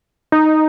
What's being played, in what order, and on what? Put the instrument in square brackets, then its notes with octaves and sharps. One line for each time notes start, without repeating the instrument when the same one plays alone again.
[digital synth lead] D#4